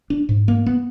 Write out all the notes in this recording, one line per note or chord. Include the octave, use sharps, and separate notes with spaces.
D4
G#2
A#3
B3